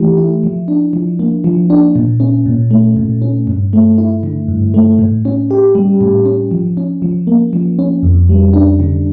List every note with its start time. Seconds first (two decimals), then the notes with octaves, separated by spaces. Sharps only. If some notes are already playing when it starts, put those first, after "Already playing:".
Already playing: E3 A3 E4 G4
0.18 E4
0.44 F3
0.68 D4
0.93 F3
1.19 A#3
1.44 F3
1.70 D4
1.96 A#2
2.20 C#4
2.46 A#2
2.71 A3
2.96 A#2
3.22 C#4
3.47 G2
3.73 A3
3.98 E4
4.23 D3
4.48 G2
4.74 A3
4.99 A2
5.25 C#4
5.51 G4
5.75 G3
6.01 A2
6.26 C#4
6.51 F3
6.77 C#4
7.02 F3
7.27 A#3
7.53 F3
7.79 C#4
8.03 F2
8.29 G3
8.53 D4
8.80 D3